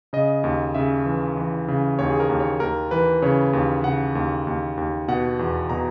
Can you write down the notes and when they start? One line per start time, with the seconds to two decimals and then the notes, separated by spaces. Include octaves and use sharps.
0.13 C#3 D#5
0.44 D#2
0.75 C#3 E5
1.06 E3
1.37 E3
1.68 C#3
1.99 D#2 C#5
2.10 G#4
2.20 A#4
2.30 D#2
2.40 C#5
2.60 D#2 A#4
2.91 E3 B4
3.22 C#3 C#5
3.53 D#2
3.84 C#3 F#5
4.15 D#2
4.47 D#2
4.77 D#2
5.08 B2 F#5
5.39 E2
5.70 B2 A#5